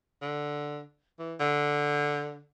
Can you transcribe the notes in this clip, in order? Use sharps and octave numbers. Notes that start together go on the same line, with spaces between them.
D3
E3
D3